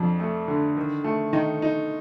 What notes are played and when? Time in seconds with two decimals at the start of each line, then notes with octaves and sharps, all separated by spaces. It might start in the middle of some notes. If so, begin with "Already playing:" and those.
Already playing: F2 F3 D4
0.20 A3
0.48 D3
0.77 D#3
1.04 A3
1.33 D#3 D#4
1.62 D#4